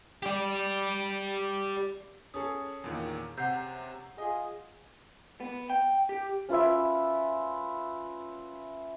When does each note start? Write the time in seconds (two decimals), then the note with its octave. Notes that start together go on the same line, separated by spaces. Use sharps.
0.23 G4 D5
2.34 C#4 G#4 A4 D#6
2.84 E2 A#2 D#3
3.37 C3 F#5 A#5 G6 C7
4.18 F4 G#4 D#5
5.40 B3
5.70 G5
6.09 G4
6.49 C#4 F4 B4 E5